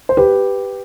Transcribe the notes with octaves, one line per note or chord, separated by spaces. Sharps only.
C5
G4 B4